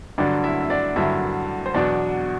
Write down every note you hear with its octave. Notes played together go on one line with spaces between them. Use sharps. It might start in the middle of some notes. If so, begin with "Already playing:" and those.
G2 D3 F#3 D4 D5
E4 E5
E5
D4 D5
G2 D3 F#3 E4 E5
C5
E2 B2 F#3 D4 D5